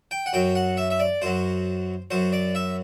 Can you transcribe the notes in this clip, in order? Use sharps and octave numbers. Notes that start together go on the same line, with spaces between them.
G5
F#5
F#2 F#3 G5
F#5
E5
E5
D5
F#2 F#3 C5
F#2 F#3 C5
D5
E5